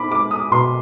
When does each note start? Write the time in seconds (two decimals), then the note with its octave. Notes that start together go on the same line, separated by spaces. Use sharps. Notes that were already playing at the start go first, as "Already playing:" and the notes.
Already playing: C4 D#4 B5 D6
0.11 G#3 D6
0.31 D#6
0.51 B2 C6